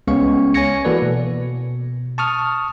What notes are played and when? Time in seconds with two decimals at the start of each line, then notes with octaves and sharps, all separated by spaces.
0.07 C#2 G#3 B3 C#4 F5 C#6
0.54 C#5 G#5 C#6 G#6 A#6 C#7
0.85 E3 A#3 F#4 A4 B4 D5
1.02 B2
2.18 A5 C#6 D#6 F6